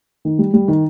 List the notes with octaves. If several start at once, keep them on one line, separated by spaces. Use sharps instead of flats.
D#3
G3
G3
D#3